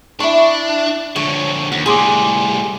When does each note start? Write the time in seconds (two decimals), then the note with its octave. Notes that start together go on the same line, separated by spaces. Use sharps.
0.20 D4 E4 C#6
1.16 D3 F3 C#5
1.72 D#2 F#5
1.86 A2 G3 G#4 C6 D6